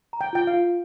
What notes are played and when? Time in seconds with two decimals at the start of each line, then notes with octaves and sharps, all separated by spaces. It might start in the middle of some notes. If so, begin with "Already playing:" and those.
0.13 A#5
0.21 G5
0.33 F4 G5
0.47 F5
0.54 F4